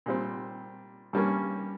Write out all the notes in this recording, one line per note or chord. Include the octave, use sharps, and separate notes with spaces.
A#2 G3 C4
G2 G3 A#3 C#4